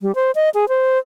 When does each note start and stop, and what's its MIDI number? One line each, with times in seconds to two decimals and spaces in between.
0.01 0.15 55
0.15 0.31 72
0.35 0.49 75
0.54 0.68 68
0.69 0.98 72